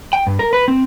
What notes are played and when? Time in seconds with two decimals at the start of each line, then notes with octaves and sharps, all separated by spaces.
0.13 G5
0.27 G2
0.39 A#4
0.53 B4
0.68 C4